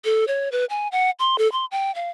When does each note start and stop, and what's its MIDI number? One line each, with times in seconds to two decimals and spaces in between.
0.05 0.25 69
0.28 0.49 73
0.52 0.65 71
0.70 0.88 80
0.92 1.10 78
1.19 1.38 84
1.38 1.50 69
1.52 1.66 84
1.71 1.94 79
1.95 2.10 77